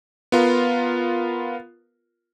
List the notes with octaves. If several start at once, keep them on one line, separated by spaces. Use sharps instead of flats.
B3 F4 A#4